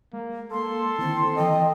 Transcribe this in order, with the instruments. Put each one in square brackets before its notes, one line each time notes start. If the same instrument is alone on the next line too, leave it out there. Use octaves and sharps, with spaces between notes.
[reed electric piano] G#3 [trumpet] A#3
[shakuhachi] A#3 [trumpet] A4 [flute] C6
[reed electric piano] D3 D#3 E4 [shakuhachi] C4
[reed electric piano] E3 A4 A5 [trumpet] D#5 [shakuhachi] G5